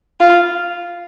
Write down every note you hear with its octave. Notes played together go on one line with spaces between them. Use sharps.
F4